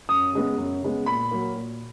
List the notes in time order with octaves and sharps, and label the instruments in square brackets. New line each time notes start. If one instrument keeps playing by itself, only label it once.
[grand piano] F#2 D#6
C#3 G#3 B3
F#2
C#3 G#3 B3
A#2 B5
F#3 A#3
A#2